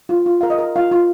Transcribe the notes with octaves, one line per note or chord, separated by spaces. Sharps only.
F4
F4
A#4 F5
D#5
A#4
F4 F5
F4